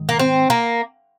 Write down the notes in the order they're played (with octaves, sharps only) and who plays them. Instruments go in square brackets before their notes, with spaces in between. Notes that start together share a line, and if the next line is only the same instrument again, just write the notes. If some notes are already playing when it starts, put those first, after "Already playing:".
Already playing: [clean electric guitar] G#2 D#3
[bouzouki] A#3
C4
A#3